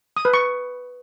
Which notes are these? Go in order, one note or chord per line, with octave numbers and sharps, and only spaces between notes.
D#6
B4
C#6